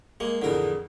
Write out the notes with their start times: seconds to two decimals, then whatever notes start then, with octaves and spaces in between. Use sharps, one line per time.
0.20 G#3 A#3
0.42 F2 A2 D3 E3 G#4 A#4